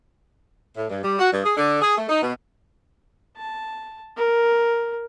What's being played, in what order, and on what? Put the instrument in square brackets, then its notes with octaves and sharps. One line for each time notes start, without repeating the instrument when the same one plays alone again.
[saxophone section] A2
G2
G3
F#4
G2
G#4
D3
G#4
A3
D#4
B2
[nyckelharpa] A5
A#4